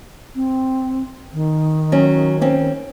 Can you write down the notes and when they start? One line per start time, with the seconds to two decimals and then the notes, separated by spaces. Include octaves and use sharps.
0.35 C4
1.33 D#3
1.92 F#3 C#4
2.41 C4 C#4